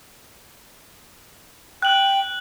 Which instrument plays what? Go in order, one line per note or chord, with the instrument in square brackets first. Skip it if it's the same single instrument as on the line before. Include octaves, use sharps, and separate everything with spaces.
[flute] G5 [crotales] F#6 F#7